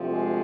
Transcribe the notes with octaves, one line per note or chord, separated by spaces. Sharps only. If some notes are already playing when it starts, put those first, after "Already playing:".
Already playing: D2 C3 F3
G#3 G#4